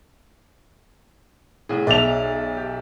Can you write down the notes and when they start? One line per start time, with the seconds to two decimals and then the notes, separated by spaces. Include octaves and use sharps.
1.69 C2 A2 G#4
1.87 B1 D5 E5 A5 F7
2.57 G4